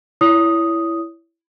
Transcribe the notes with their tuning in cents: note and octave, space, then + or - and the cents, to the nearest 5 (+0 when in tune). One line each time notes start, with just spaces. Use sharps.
E4 +10 C#5 +30 D#6 +0